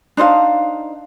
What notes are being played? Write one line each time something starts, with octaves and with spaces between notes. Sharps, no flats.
D4 D#4 C5 F5